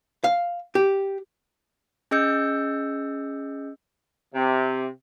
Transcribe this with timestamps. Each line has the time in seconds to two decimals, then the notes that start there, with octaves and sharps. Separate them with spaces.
0.24 F5
0.75 G4
2.11 C#4 G#4 D#5 E6 G6 C#7
4.35 C3